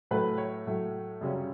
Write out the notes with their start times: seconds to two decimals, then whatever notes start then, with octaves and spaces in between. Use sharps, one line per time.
0.11 A2 F#3 A3 B4
0.38 C#5
0.66 A2 F#3 A3
1.21 F#2 C#3 G3 C#4